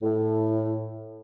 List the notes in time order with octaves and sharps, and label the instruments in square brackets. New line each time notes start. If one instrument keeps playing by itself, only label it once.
[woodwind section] A2